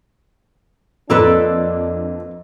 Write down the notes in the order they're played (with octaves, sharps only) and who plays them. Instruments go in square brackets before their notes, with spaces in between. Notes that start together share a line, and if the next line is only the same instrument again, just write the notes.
[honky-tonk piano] F2 [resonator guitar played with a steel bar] A#3 A4 B4 [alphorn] D4 [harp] D#5 C6 E6